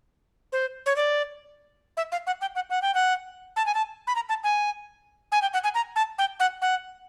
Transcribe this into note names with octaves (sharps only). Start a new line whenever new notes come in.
C5
C#5
D5
E5
F5
F#5
G5
F#5
F#5
G5
F#5
A5
G#5
A5
B5
A#5
A5
G#5
G#5
G5
F#5
G#5
A#5
A5
G5
F#5
F#5